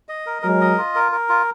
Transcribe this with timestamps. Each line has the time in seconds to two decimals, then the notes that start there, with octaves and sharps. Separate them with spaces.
0.09 D#5
0.26 A#4
0.42 F#3 G#3 A#4
0.61 D#5
0.78 F4
0.95 A#4
1.12 A#4
1.29 F4